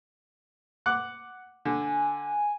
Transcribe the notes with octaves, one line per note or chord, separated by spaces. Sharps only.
F#5 D6 F#6
D3 G#5